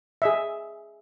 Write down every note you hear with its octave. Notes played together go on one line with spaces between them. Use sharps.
G#4 D#5 E5